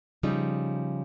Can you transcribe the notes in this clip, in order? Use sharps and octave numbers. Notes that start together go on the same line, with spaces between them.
C#3 F3 G3 D#4